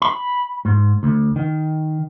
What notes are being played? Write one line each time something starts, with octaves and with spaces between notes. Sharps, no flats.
B5
G#2
D2
D#3